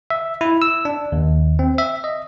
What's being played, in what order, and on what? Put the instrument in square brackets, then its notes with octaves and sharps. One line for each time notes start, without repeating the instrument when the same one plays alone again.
[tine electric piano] E5
E4
E6
D4
D#2
C4
E5
D#5